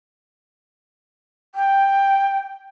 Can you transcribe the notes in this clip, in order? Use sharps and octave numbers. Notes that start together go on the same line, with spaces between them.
G5